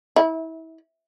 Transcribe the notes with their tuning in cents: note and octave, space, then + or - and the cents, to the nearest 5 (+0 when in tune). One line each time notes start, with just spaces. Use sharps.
E4 -30